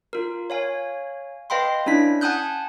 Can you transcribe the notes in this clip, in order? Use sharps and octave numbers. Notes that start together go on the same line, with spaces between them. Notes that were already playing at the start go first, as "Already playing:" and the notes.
F4 A#4
C#5 F5 G#5
B4 D#5 F5 G5 B5 C6
C#4 D4 E4 B6
F#5 G#5 A5 D#6 F#6 G6